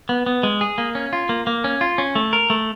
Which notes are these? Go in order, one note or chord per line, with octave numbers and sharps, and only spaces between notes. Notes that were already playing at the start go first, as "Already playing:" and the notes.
B3
B3
G#3
G#4
A#3
C#4
F4
A#3
A#3
C#4
F4
C#4
A3
A#4
A3